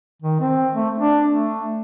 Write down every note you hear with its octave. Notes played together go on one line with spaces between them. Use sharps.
D#3
C4
A3
D4
A3